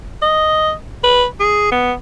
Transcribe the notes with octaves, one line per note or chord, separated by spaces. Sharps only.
D#5
B4
G#4
B3